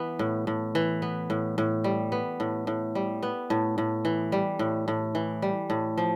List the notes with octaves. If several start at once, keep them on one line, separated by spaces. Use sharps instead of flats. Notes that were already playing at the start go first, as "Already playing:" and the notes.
Already playing: E3 B3
A2
A2
E3
B3
A2
A2
G3
B3
A2
A2
G3
B3
A2
A2
E3
G3
A2
A2
E3
G3
A2
F3